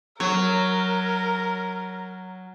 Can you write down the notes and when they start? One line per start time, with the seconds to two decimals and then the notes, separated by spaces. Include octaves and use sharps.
0.20 F#3 A#4 C#5